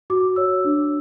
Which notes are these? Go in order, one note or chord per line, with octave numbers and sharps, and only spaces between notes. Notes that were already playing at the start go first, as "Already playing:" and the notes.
F#4 D6
C#5 E6
D4